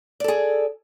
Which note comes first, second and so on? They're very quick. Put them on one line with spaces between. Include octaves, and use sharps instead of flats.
D5 A4 G#4